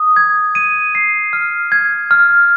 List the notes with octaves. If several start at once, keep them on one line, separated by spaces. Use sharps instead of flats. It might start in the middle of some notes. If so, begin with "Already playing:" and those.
Already playing: D#6
G#6
D#7
C7
F6
G#6
F6